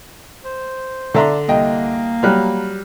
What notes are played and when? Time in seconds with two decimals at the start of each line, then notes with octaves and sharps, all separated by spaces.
0.45 C5
1.14 D3 A4 D5 E5 A#5 C6
1.49 C2 A#3 D#5 G5
2.23 F#3 G3 F6 F#6